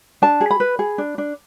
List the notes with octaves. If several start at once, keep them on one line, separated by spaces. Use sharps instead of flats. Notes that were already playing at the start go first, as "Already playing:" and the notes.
D4 A5
G#4
B5
B4
G#4
D4
D4